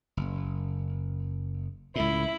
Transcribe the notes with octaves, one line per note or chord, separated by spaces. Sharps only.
F#1
C#2 A2 E4